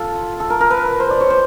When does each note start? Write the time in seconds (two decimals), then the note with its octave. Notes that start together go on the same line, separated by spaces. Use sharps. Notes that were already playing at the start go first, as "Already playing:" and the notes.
Already playing: F4 A4
0.40 A4
0.50 A#4
0.61 A#4
0.70 B4
1.00 C5
1.11 D5
1.21 C#5
1.30 C5